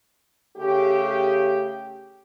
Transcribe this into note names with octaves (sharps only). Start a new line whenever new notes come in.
C#3 A3 G4